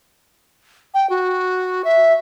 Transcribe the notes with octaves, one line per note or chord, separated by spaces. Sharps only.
G5
F#4
E5